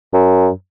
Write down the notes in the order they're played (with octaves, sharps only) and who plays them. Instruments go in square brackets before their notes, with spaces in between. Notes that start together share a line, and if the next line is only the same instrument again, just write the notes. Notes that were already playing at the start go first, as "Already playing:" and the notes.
[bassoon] F#2